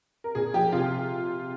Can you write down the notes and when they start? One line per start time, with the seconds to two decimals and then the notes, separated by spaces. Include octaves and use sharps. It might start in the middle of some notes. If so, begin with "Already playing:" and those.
0.24 A#4
0.35 A#2 G#4
0.54 F3 G4
0.72 C3 F4